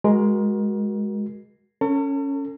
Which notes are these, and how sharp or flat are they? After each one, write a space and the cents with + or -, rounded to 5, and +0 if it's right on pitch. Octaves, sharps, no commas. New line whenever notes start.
G#3 +0 F#4 +0 A#4 +25
C#4 +0 A4 +45